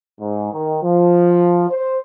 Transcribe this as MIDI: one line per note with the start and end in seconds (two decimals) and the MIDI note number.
0.20 0.52 44
0.53 0.79 51
0.83 1.66 53
1.70 1.99 72